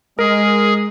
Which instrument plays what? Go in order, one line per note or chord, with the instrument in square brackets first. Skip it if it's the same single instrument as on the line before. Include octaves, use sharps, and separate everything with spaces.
[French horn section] G#3 [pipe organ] G#4 [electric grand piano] A#4